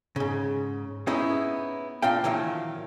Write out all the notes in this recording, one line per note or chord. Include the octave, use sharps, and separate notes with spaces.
G#2 C#3
B3 C#4 D#4 E4 G#4
A#2 D4 F4 F5 G5
A#2 D#3 E3 F#3 A#3